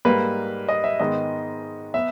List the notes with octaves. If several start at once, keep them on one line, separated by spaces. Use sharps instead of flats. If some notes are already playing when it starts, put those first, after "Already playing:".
G#2 G3 A#3 B4
D#5
E5
G#2 D#3 G#3 B3 D#5
B3 E5